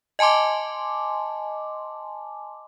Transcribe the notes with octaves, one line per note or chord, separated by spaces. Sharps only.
D#5 G#5 A5 C6 D6